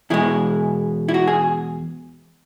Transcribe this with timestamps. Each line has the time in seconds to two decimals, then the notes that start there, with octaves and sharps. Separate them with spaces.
0.10 E2 B2 G#3 E4
1.08 E4
1.14 F#4
1.27 G#4